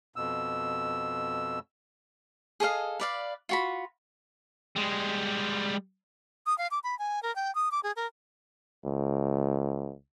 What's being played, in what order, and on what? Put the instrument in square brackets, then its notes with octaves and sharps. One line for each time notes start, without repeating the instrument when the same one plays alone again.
[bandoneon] F2 B2 E6
[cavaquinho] G#4 A4 D#5 F5
B4 D5 F5
F4 F#4 B5
[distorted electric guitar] G3 G#3
[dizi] D#6
F5
D6
B5
G#5
A#4
G5
D#6
D6
G#4
A#4
[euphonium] C#2